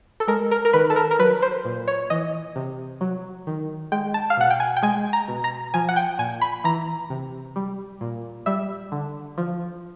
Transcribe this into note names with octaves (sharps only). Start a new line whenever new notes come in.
A4
G#3 A#4
A#4
A#4
D#3 B4
A4
A#4
A#4
F#3 B4
C5
A#2
C#5
E3 D#5
C3
F#3
D#3
G#3 G5
A5
F5
B2 F#5
G5
G#5
G5
G#3 G#5
A#5
B2
A#5
F3 G#5
F#5
G5
A#2 G#5
B5
E3 A#5
C3
G3
A#2
G3 E5
D3
F3